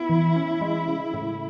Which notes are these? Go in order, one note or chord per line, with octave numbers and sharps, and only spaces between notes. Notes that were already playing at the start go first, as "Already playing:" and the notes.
Already playing: B3 E4
E3
C#4
G#3
C#3
A2